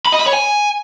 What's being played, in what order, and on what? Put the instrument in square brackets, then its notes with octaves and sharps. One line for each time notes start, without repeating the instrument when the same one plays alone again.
[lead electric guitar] B5
D#5
B5
C#5
G#5